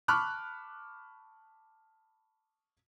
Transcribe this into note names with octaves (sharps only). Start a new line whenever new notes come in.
A5 B5 C#6 D6 F6 F#6